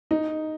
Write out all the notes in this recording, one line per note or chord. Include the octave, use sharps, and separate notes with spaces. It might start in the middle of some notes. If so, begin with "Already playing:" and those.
D#4